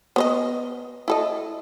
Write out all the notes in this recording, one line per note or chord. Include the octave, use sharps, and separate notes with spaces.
B3 C5 D#5
E4 A4 D#5